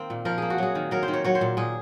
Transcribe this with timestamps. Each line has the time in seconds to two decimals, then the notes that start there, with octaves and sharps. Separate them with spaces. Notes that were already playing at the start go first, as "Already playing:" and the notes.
Already playing: D#3 A#3 C4
0.10 A#2
0.25 F3 A#4
0.38 A#3 G#4
0.50 F#4
0.58 F#3 G#4
0.75 D#3
0.91 F#3 A#4
1.03 C5
1.08 D#3
1.13 C#5
1.24 F#3 C#5
1.35 C5
1.41 A#2
1.57 A#2 G#4